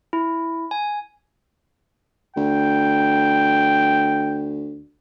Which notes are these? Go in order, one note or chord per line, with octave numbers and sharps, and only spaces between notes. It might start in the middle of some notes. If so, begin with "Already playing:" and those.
E4
G#5
D2 G5